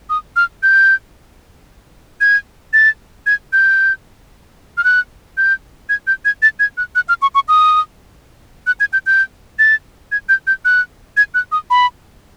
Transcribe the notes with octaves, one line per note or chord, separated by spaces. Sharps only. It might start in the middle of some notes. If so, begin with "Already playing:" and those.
D#6
F6
G6
G#6
A6
G#6
G6
F6
F#6
G6
G#6
G6
G#6
A6
G#6
F#6
F#6
F6
C#6
C#6
D#6
F#6
G#6
G6
G6
A6
G#6
G6
G6
F#6
G#6
F#6
D#6
B5